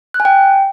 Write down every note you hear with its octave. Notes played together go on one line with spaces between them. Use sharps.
F#6
G#5
G5